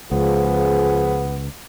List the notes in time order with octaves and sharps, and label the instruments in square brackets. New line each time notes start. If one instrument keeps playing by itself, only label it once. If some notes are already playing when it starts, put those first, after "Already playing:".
[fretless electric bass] C#2 [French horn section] F3 G#4 [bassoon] B3